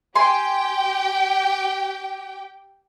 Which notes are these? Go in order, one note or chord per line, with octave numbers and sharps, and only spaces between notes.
G4 G5 G#5 C6